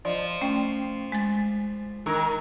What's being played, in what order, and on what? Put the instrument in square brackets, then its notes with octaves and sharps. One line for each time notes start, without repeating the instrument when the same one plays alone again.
[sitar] F3 [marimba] D5 D#5
[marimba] A3 C#4 G5
G#3 G#5 A6
[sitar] D#3 A#4